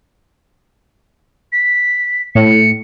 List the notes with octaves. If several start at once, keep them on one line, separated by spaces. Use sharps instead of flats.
B6
A2 C#7